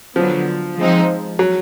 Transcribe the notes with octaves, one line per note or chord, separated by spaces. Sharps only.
D3 F3 F#3 B3
F3 G#3 C4 D#4
F#3